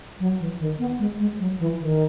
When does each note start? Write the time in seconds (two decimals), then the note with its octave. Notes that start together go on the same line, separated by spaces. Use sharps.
0.19 F#3
0.39 E3
0.59 D#3
0.79 B3
0.99 G#3
1.19 G#3
1.39 F#3
1.59 E3
1.79 D#3